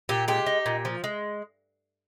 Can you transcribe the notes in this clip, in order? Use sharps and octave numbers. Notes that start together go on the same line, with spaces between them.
A#2 G4
G#3 G4
D#4
A#2
F3
G#3